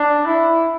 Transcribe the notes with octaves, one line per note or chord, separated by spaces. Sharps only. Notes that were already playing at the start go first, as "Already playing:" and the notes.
Already playing: D4
E4